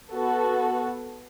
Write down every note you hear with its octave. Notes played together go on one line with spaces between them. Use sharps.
B3 F#4 A4